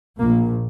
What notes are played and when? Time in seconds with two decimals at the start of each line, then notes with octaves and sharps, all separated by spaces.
0.18 A#1 A#2 A#3